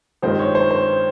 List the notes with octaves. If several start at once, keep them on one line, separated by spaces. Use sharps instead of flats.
G2 D#3 G#3 C4 F4 C5
C#5
C5
C5